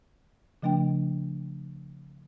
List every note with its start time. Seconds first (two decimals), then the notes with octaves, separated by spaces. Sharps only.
0.62 C#3 F3 A3 D4 G5